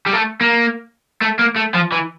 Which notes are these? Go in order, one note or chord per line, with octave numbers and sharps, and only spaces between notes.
G3
A3
A#3
A3
A#3
A3
F3
E3